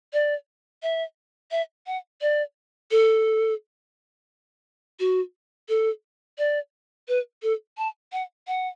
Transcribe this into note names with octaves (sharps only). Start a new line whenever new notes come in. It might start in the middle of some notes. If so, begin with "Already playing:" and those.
D5
E5
E5
F#5
D5
A4
F#4
A4
D5
B4
A4
A5
F#5
F#5